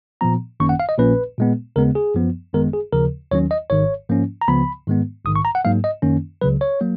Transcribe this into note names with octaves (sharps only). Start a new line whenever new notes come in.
A#2 F3 B3 A#5
G#1 F#2 D#3 A#3 C#4 C#6
F#5
F5
D#5
A#1 A#2 F3 A#3 C#4 B4
A#2 G#3 B3
D#2 C#3 G#3 B3 A#4
G#4
F#2 F3 B3
G#1 F#2 D#3 G#3 B3 A#4
G#4
D#2 C#3 F3 A#4
D#2 D#3 F#3 C#4 C#5
D#5
G#1 G#2 D#3 C#5
G#2 F3 A#3 C#4
A#5
C#2 C#3 F3 B3 B5
G#2 D#3 G#3 B3
A#1 G#2 D#3 D#6
C#6
A#5
F#5
G#2 F#3 A#3 F5
D#5
F#2 D#3 A#3 C#4
C#2 C#3 F#3 B4
C#5
F#3 A#3